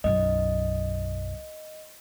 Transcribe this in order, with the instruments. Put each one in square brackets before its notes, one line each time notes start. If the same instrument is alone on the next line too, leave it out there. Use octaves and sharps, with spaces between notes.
[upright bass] B1 F#2 [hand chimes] D#5